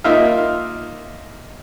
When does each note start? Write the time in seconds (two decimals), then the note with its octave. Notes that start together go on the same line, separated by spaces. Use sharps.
0.04 A#3 D#4 F4 E5 F5